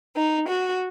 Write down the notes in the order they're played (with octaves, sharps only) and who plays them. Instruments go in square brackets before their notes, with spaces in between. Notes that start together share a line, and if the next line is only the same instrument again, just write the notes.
[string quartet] D#4
F#4